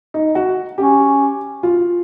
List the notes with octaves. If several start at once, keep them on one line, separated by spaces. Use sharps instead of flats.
D#4
F#4
C#4 G4
F4